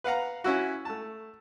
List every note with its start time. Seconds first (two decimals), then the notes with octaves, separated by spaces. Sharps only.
0.04 B4 F5 F#5 A#5
0.44 C#4 E4 F#4
0.85 A3 A5